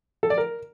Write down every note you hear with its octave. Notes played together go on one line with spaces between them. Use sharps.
A4
D5
A#4